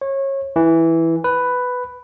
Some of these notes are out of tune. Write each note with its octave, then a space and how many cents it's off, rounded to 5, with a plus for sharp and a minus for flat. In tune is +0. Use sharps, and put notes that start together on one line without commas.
C#5 -25
E3 -5
B4 +5